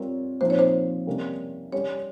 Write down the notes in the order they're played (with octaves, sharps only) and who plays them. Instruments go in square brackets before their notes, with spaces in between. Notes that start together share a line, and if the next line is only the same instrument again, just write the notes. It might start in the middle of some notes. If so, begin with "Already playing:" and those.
Already playing: [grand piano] G3 C4 F4 A#4 C#5
[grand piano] A#2 F3 C4 D#4 [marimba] C5
[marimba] C#5
C5
[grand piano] C3 G3 A#3 C#4
[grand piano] G3 C#4 G4 [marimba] C#5